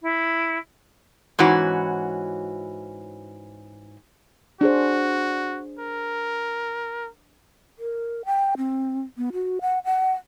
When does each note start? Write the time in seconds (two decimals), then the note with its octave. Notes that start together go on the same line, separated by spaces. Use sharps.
0.01 E4
1.39 G#2 E3 C#4 F#4
4.61 D4 F#4 G#4 C5
5.79 A#4
7.79 A#4
8.25 G5
8.57 C4
9.17 B3
9.33 F#4
9.61 F#5
9.85 F#5